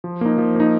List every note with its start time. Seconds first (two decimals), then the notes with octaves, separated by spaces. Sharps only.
0.04 F3
0.21 A#3 D#4
0.38 F3
0.56 A#3 D#4